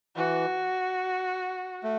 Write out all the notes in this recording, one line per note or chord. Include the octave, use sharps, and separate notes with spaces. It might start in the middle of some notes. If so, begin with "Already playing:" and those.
E3 F#4
A3